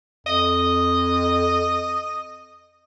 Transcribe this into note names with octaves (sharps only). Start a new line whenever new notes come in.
F2 D#5